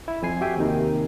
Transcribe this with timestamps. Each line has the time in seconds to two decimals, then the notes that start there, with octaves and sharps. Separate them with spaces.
0.08 E4
0.22 F2 F3 G#5 C7
0.41 F#4 G4 E5 G5 G#5
0.57 D#2 C3 D#3 D#4